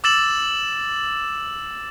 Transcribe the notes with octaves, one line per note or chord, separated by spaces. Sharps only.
D6 E6 A6 E7 F#7